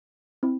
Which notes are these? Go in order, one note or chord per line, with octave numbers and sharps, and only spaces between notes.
C4 E4